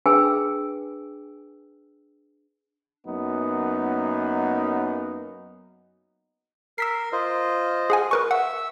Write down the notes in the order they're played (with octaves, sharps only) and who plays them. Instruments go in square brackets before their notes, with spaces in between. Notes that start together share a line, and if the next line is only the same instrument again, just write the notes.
[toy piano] D4 G#4 B4 G5 G#5 E6
[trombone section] F#2 A#3 B3 D#4
[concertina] A#4 [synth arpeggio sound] E6 B6 C7
[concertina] F4 C5 D#5
[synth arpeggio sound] G#4 F#5 G#5
A#4 B4 C#6
[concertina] E5 E6 [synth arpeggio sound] F#5